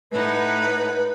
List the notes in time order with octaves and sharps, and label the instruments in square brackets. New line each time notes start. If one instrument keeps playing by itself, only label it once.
[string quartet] A2 D#4 F#5 [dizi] B4